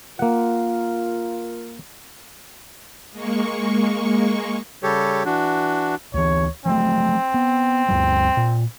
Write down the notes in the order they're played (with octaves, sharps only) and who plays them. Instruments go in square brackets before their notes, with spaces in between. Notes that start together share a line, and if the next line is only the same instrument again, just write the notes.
[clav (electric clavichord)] A#3 F#5 [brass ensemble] F4 A#4
[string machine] G#3 A#3 C#6
[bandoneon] C#3 G3 G4 A4 C#5
E3 D4 F#4
[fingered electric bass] D2 E3 [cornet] C#5
[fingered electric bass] F3 F#3 A3 [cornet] C4
[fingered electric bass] B3
D2 G2 G3
A#2